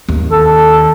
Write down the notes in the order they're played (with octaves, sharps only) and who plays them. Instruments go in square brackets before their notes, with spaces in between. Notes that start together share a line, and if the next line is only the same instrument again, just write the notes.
[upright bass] D#2
[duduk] A4